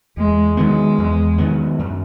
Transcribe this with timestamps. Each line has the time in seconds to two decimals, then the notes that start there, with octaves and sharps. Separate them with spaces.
0.17 E2 G#3
0.57 D#3 F#3 G#3 B3
0.98 E2
1.38 D#3 F#3 B3
1.79 F#2